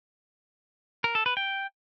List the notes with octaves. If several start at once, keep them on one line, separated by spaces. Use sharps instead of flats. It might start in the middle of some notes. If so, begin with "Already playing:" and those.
A#4
A4
B4
G5